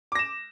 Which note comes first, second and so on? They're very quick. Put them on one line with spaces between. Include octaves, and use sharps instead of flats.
D6 A#6 E7